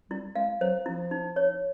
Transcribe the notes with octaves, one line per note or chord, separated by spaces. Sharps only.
G3 E4
G#3 F5
F#3 C5
F3 E4
D#4
C#5